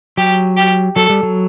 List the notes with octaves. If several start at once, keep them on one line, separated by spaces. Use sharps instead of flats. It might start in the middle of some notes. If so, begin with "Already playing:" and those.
F#3 G4
G4
F#3 A4
G3
F#3